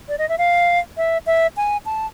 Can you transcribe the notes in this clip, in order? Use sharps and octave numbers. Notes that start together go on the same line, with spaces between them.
D5
D#5
E5
F5
E5
E5
G#5
A5